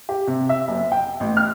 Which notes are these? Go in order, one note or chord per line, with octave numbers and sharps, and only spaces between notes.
G4
C3
E5
F#1
G5
A1
F6